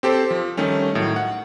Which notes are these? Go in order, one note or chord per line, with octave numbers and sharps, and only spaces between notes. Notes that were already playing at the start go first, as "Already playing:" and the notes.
C4 G4 A4 C5
F3
D#3 G3 A3 C#4
A2 D#3 F#3
F#5